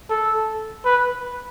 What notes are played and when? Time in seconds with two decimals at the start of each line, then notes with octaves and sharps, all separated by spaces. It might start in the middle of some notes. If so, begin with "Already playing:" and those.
0.10 A4
0.85 B4